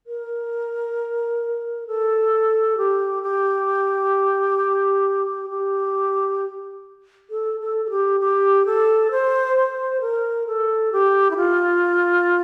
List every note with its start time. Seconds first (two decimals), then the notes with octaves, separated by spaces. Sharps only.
0.07 A#4
1.87 A4
2.77 G4
3.23 G4
5.50 G4
7.30 A4
7.60 A4
7.86 A4
7.90 G4
8.20 G4
8.66 A4
9.11 C5
9.57 C5
10.01 A#4
10.47 A4
10.92 G4
11.31 E4
11.37 F4